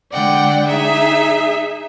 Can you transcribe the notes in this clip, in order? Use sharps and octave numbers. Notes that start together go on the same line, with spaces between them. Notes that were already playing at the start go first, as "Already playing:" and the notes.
D3 G#3 D5 F#5 G5
D#4 G#4 E5